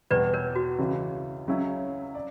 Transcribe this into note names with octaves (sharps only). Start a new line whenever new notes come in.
E2 B2 G3 B4 D5
A#4 C#5
F#4
C#2 C#3 E3
C#2 C#3 F#3 C#4 E4
D5